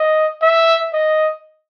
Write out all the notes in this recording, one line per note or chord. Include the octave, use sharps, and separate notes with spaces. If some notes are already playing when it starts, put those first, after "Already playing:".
Already playing: D#5
E5
D#5